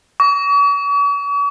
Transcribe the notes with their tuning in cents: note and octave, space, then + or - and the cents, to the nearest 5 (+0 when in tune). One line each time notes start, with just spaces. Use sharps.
C#6 +45